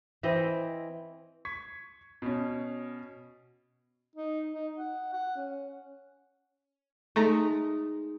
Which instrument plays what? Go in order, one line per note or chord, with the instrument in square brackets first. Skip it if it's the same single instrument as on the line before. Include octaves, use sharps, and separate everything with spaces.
[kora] E3 C4 E4 D#5
[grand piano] C#6 G#6 B6
B2 C#4
[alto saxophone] D#4
D#4
F#5
F#5
C#4
[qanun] G#3 D#4 [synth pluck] A3 A#5